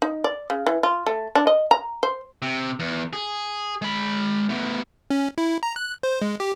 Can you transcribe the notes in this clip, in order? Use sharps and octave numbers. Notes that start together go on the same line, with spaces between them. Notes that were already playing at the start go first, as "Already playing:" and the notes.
D#4
D5
C#3
E3
F4
A3
D4
D#5
A#5
C5
C3
E2
G#4
G#3 B5
A3 B3
C#4
E4
A#5
F#6
C5
G#3
G4